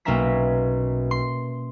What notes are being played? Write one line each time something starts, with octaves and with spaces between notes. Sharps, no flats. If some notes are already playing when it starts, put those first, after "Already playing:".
B1 A#3 C#4 E5 A#5 B6
C6